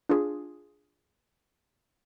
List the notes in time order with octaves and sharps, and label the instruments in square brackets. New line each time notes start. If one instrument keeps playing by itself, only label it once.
[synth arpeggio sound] D4 F4 G#4